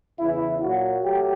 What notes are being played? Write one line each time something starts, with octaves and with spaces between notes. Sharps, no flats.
E2 C#3 E3 E4
A#2 F#3 A#3 F#4
F#3 A3 G4